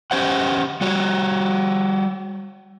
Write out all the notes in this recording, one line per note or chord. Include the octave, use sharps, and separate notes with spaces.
C#4 G4 C5 F#5
G3 F#4